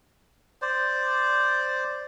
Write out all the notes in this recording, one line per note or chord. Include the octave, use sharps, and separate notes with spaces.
C5 D5